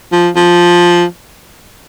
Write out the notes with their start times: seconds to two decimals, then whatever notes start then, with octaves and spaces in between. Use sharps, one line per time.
0.12 F3
0.36 F3